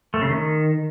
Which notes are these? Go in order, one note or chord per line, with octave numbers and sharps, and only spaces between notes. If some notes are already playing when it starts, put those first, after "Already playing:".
A3
C#3
D#3